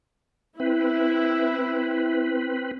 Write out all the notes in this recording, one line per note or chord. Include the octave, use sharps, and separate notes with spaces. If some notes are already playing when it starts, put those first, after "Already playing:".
C4 E4 B4